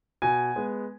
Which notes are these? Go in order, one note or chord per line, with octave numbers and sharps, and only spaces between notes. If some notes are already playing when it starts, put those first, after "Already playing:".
B2 G#5
G#3 B3